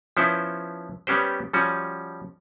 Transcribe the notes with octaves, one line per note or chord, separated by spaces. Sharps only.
F3 B3 C#4 E4 C5
G3 B3 C#4 G4 C5
F3 G3 C#4 F#4